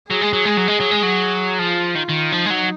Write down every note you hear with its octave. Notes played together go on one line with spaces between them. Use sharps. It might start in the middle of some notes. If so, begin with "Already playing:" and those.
F#3 G#4
G#3
F#3
G#3
F#3
G#3
F#3
G#3
F#3
F3 F4
D#3
D#3
F3 D#4
G#3
F#3